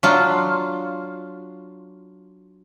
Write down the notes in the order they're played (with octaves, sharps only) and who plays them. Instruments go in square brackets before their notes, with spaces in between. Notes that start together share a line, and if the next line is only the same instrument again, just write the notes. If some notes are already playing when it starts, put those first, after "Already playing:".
[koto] F#3 D4 F4